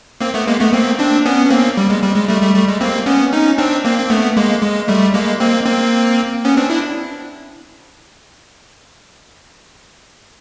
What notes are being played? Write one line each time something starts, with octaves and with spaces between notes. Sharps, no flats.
A#3 C4
A3 B3
G#3 A#3
A3 B3
A#3 C4
C4 D4
B3 C#4
C#4
A#3 C4
G3
G#3
G3
G#3
G3 A3
G3 A3
G3 A3
G#3
A#3 C4
B3 C#4
C#4 D#4
C4 D4
A#3 C4
C4
A3 B3
G#3 A#3
G#3
G3 A3
G#3 A#3
A#3 C4
A#3 C4
B3 C#4
C4 D4
D4 E4